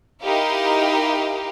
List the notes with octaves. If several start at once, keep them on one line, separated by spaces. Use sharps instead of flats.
D#4 E4 G4 A#4 F5